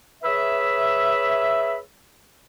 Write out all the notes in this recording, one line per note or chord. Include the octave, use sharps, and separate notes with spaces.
G#4 B4 C#5 E5